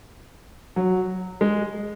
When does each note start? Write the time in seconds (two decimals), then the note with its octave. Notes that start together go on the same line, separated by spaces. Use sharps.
0.76 F#3
1.41 G#3